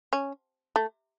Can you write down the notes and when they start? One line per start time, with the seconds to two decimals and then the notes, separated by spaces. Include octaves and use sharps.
0.13 C#4
0.76 A3